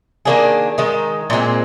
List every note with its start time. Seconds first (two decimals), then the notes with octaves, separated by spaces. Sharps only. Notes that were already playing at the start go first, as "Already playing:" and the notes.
0.25 D#3 A#3 D4 G#4
0.78 D#3 G#3 D#4
1.30 A#2 G#3 C4